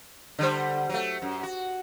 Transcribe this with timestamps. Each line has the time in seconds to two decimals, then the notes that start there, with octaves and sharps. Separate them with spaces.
0.39 D3 G3 C5
0.89 F#3 A3
1.22 F#2
1.43 F#4